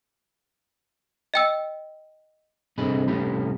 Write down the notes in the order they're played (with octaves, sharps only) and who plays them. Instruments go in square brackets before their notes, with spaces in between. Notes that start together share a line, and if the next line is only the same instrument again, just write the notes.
[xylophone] D#5 G5 E6
[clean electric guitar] C2 D3 C4 G#4 D#5 B5
C2 A3 C#4 G4 B5